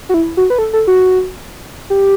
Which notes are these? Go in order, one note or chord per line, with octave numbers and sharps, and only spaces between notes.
F#4
E4
F#4
B4
A4
A4
F#4
G4